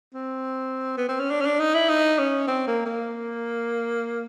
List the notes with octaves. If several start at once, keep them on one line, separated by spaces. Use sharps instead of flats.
C4
B3
C4
C#4
D4
C#4
D4
D#4
E4
D#4
C#4
C4
A#3
A#3